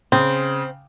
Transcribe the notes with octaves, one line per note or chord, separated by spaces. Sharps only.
C#3 C4